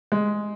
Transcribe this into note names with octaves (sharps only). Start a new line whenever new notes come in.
G#3